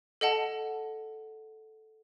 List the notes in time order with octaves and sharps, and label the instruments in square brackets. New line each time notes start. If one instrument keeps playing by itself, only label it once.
[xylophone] A4 D#5 F#5 A5